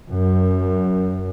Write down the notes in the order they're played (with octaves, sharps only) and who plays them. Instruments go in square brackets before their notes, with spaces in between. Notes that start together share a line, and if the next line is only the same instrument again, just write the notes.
[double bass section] F#2